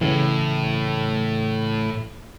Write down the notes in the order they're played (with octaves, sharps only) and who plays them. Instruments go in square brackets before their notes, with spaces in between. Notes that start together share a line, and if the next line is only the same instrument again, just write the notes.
[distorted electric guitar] A2 [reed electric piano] C#3 E3